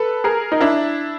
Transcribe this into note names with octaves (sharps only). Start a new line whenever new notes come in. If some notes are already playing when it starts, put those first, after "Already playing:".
Already playing: A4 B4
G#4 A#4
D#4
D4 E4